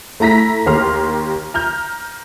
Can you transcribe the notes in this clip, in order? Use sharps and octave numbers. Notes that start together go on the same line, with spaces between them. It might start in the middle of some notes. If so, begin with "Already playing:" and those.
A3 E4 A#5 A#6 B6
D#2 G4 A#4 C6 F6
A#5 F6 G6